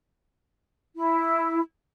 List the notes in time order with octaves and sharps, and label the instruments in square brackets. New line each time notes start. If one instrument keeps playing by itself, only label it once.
[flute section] E4